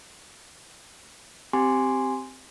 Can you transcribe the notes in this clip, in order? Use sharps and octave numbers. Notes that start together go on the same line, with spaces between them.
C4 G4 G#5 C6